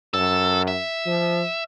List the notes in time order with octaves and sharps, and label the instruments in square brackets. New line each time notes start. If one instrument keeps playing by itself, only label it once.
[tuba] F#2 [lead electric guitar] A4
[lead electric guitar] E5
[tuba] F3